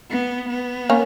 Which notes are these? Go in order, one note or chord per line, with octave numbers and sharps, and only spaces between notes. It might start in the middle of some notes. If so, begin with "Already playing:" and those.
B3
B3
A#3 C#4